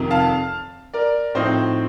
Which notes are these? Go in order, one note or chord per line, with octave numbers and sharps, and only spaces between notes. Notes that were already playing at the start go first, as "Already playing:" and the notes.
Already playing: F1 F2 C3 D#3
F5 A5
A#4 D5
A2 F3 C4 D#4 C5